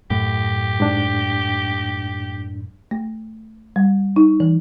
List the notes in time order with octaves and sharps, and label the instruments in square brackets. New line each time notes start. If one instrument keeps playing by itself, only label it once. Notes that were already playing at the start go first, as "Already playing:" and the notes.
[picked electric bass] F#2 A2 A3 [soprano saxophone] G4
[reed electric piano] G#2 D4
[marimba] A3
G3
D#4
E3